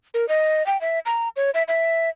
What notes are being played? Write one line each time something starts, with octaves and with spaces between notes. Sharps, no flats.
A#4
D#5
G5
E5
A#5
C#5
E5
E5